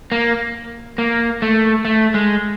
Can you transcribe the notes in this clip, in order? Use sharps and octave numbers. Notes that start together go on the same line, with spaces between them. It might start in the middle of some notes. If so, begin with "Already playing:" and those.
A#3
A#3
A3
A3
G#3